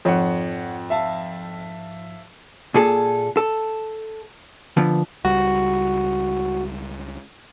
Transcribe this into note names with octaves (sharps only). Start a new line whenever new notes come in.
F2 G#2 F3 C#5 F#5
E5 F5 A5
A#2 G#4 A4
A4
D3 F3 B3
C#2 G3 F#4